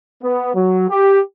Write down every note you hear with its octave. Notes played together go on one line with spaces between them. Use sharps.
B3
F#3
G4